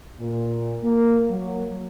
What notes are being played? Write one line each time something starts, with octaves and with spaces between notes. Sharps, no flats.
A#2
A#3
F#3